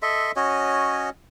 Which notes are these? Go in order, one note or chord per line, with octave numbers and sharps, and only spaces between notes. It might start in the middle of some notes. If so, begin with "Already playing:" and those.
A4 D#5 E5 C6
C#4 F#4 C#5 D#5